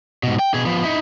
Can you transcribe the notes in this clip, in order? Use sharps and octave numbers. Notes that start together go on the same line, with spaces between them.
G#2 B2
G5
B2 G#4
F3 B3
D#4 E4